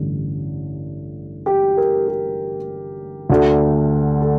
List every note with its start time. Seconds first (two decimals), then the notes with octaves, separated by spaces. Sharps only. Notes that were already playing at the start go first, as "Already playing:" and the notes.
Already playing: A1 G2 D3
1.46 G4
1.77 A#4
2.07 G4
3.30 D2 D3 A3
4.21 A4